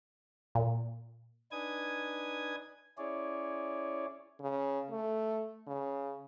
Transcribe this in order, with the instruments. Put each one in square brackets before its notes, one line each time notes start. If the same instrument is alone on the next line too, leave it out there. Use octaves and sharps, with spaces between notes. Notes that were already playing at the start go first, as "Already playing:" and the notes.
[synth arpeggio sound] A#2
[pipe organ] D4 D#4 B4 G#5 D#6 G#6
C#4 E4 G#4 C#5 D5
[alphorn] C#3
A3
C#3